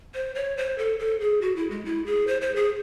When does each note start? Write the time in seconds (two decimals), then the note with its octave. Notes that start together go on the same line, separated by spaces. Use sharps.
0.14 C5
0.35 C#5
0.57 C5
0.78 A4
0.99 A4
1.20 G#4
1.42 F#4
1.56 E4
1.70 G#3
1.85 E4
2.06 G#4
2.27 C5
2.42 C5
2.56 G#4